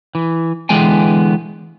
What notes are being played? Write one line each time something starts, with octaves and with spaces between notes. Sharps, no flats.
E3
D3 E3 G#3 B3 G5 G#5